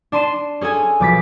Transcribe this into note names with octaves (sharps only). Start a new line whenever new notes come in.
D4 A5 C6 D#7 E7
C#4 G#4 A4 G#5
B1 F3 D6 A6 B6